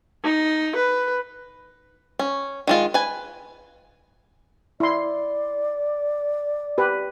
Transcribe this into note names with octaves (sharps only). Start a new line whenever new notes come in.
D#4
B4
C#4
D#3 G#3 F4
B4 G#5
E4 D5 C6
G4 B4